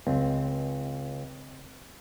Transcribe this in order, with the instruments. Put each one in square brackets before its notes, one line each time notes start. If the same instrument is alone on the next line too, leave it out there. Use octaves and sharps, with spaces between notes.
[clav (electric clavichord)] C#2 [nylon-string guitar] C4